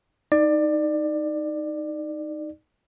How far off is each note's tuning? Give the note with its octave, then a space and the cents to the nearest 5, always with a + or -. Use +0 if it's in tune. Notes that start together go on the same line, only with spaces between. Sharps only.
D#4 +0 D5 +20